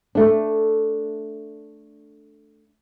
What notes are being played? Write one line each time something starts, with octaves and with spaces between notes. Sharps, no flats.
A3 D4